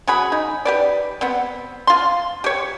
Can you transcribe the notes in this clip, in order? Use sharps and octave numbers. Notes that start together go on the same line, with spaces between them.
F#3 G#4 B5
D#4
G4 B4 D5
B3 C4
F4 C6
G4 C#5